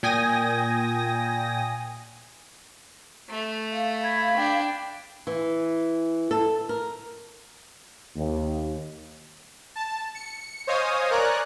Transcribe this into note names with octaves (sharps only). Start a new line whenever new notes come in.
A#2 G5 G#5 D#6 A#6
A3
F5
B5 G#6
D4 G5
E3
A4
A#4
D#2
A5
C#7
C5 C#5 D#5 F5 G#5 D#6
A#4 C#5 D5 G#5 A#5 F#6